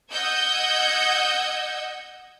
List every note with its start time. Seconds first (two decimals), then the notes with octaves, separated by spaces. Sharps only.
0.10 D#5 F#5 E6 G6 G#6